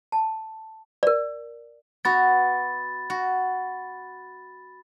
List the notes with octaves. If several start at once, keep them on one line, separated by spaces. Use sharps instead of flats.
A5
A#4 D5
B3 F#4 B5 A6
F#4